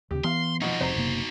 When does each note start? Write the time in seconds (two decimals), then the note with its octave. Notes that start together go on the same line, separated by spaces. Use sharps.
0.11 D#2 C#3 G4
0.24 E3 B3 F5 C6
0.62 B2 F3 D#4 F#4
0.81 F1 C3 C5 A#5
0.96 F#1 C3 A#3